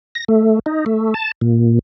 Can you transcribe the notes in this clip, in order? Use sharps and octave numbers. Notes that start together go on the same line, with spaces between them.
A#6
A3
D#4
A3
A5
A#2